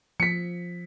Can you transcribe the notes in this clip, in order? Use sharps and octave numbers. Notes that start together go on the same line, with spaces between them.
F3 B6 C#7